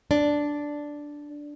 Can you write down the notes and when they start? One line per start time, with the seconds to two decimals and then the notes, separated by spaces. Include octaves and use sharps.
0.11 D4